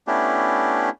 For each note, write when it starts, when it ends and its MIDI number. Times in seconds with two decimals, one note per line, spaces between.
0.07 0.90 57
0.07 0.90 59
0.07 0.90 61
0.07 0.90 62
0.07 0.90 64
0.07 0.90 67